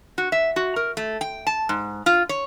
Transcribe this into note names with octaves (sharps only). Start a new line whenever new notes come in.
F#4
E5
F#4
A#4
A3
G5
A5
G#2
F4
C#5